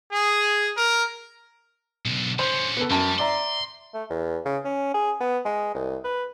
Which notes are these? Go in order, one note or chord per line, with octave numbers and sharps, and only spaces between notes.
G#4
A#4
B1 D3
D3 C#4 C5
B3 A4
F#2 G3 A5
D5 E5 A#5 C6
A3
E2
C#3
C#4
G#4
B3
G#3
C2
B4